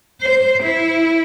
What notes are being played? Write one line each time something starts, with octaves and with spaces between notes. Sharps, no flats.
C5
E4